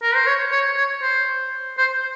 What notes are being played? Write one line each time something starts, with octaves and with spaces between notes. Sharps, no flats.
A#4
C5
C#5
C#5
C#5
C5
C5